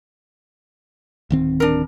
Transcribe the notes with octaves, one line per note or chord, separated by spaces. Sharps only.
D1 D#3 C4
D4 A#4